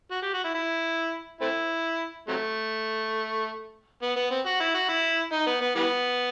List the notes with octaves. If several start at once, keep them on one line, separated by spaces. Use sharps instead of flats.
F#4
G4
F#4
E4
E4
A3 C4 E4
C3 F#3 A3
B3
B3
C4
F#4
E4
F#4
E4
D#4
B3
B3
E3 G3 B3